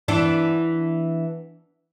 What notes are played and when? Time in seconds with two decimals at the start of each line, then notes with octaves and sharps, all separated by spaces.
0.08 E3 B3 D4